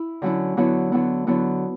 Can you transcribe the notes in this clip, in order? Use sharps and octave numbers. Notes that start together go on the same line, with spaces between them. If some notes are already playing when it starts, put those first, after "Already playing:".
Already playing: E4
D3 F#3 C#4 E4
D3 F#3 B3 E4
D3 F#3 B3 E4
D3 F#3 B3 E4